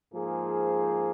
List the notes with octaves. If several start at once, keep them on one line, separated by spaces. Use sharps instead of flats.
G#2 F3 A#3 G#4 C5